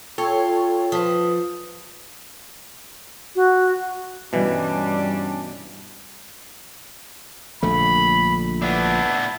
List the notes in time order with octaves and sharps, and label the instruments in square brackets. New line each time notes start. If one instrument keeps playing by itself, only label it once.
[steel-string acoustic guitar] F4 [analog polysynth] A4 C#5 [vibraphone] G5
[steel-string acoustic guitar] F3 [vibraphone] B4 D#6
[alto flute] F#4
[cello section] G2 G3 [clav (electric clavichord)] B2 E3 [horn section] C#4 D4
[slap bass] A#1 D3 A3 [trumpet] B5
[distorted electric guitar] B3 D4 [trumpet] E4